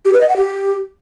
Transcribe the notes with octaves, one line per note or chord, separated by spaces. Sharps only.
G4
B4
D#5
F#5
G4